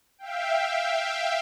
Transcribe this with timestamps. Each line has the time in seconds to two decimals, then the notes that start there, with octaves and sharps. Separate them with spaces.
0.18 E5 F5 G5